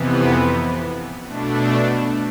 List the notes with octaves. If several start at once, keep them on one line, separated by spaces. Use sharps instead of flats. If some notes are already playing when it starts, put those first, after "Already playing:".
Already playing: F2 C3 E3 B3
B2 A3 D4